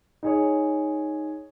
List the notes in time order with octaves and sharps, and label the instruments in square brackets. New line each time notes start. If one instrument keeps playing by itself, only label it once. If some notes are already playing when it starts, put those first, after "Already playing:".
[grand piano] D#4 G#4 C#5